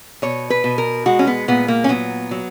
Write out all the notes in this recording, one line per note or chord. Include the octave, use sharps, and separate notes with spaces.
B2 C#5
B4
B2
A#4
G#3 F#4
C#4
B3
A#2 B3
A#3
C#4
F#3 B3
F#3